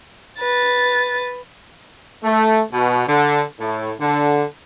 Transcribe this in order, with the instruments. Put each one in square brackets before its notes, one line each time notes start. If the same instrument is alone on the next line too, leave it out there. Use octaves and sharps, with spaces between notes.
[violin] B4 A6
[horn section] A3
B2
D3
A2
D3